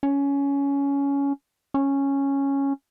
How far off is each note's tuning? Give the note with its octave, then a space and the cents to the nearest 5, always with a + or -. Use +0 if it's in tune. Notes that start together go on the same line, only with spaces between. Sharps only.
C#4 +15
C#4 -5